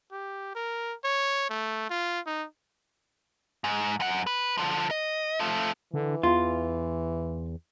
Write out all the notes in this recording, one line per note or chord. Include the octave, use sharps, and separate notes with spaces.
G4
A#4
C#5
A3
F4
D#4
G#2
F#2 F#5
B4
D3 F3
D#5
F3 A3
D3 E3
E2 F4